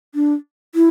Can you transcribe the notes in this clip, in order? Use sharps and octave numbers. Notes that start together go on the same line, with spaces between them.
D4
E4